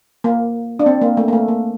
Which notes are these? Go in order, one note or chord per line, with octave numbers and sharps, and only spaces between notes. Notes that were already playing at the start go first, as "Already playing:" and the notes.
A#3
D4
C4
A#3
A3
A#3
A3
A#3